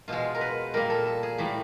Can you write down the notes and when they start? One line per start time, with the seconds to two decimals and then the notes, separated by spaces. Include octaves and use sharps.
0.08 B2 G#3 F4
0.35 A#4
0.41 B4
0.74 A#2 G3 A#3 A#4
0.90 A4
1.05 A4
1.23 G#4
1.38 A2 E3 G3 A#3